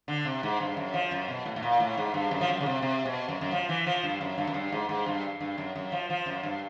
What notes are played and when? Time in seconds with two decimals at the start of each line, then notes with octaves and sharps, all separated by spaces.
0.08 D3
0.25 C3
0.43 G#2
0.60 G2
0.77 F#2
0.94 F3
1.11 F#2
1.28 B2
1.46 A2
1.56 A2
1.62 A#2
1.80 A2
1.97 G#2
2.14 G2
2.31 F#2
2.41 F3
2.48 F#2
2.61 C#3
2.66 C3
2.82 C3
3.06 B2
3.29 F#2
3.41 F#2
3.52 F3
3.69 E3
3.86 F3
4.03 G2
4.21 F#2
4.38 G2
4.47 F#2
4.54 G2
4.72 G#2
4.89 G#2
5.06 G2
5.41 G2
5.58 F#2
5.76 F#2
5.92 F3
6.10 F3
6.26 F#2
6.43 G2